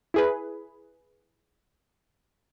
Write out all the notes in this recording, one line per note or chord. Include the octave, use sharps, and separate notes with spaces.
E4 G#4 B4